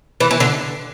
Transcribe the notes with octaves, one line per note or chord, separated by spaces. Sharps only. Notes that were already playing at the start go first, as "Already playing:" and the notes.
E3
E3
D3